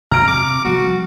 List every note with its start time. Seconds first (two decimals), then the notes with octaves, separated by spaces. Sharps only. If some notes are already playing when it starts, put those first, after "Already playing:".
0.11 C3 C4 A#5 F6 D7
0.27 D6
0.65 F3 G3 B3 F#4